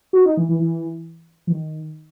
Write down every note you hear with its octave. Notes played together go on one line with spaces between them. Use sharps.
F#4
D#4
E3
E3
E3
E3
D#3